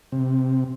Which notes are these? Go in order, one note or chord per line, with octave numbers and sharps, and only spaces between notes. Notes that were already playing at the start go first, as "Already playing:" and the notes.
C3